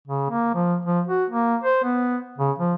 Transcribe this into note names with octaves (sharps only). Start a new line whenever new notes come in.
C#3
A#3
F3
F3
F#4
A#3
C5
B3
C#3
F3